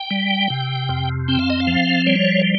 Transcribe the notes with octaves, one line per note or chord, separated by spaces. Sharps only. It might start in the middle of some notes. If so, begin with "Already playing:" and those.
Already playing: G5
G3
C3
F2
C4 G5
F5
D#5
F5
F3
G3 C#5